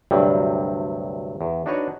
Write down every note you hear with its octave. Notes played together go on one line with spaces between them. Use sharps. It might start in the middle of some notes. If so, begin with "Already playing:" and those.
D2 G2 C3 F#3 G3
E2
D4 D#4 F#4 B4 C#5